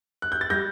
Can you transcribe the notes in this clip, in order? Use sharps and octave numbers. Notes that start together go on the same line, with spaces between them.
F#6
G6
A6
G3 G6 A#6